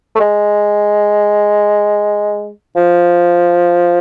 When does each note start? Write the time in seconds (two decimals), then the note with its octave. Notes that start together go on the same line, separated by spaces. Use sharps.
0.15 A3
0.20 G#3
2.76 F3